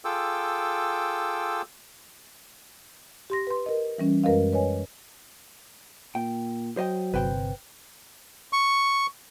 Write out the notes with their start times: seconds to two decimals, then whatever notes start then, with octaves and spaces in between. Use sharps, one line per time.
0.05 F4 G#4 A4 G5 D6 E6
3.30 G4 C6 A#6
3.47 B4 C6
3.66 A#4 D#5
3.98 E3 G3 C#4
4.24 F#2 G#3 A#4 B4 D#5 F5
4.53 B4 C#5 D#5 G#5
6.15 A#2 G5
6.77 F#3 C5 D#5 G5
7.14 G1 C3 B4 C5 G5
8.53 C#6